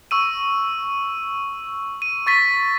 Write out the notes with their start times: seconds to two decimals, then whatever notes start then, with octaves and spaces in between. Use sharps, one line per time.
0.11 C#6 E6 D#7
2.02 D#7
2.27 C#6 A6 B6